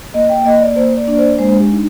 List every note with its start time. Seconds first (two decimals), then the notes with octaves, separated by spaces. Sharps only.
0.14 A#3 D#5
0.30 G5
0.45 A#3 D#5
0.61 D5
0.76 A#3 C5
0.97 D5
1.08 D4
1.14 D5
1.18 C5
1.39 G#3 C5
1.60 G4
1.70 D#4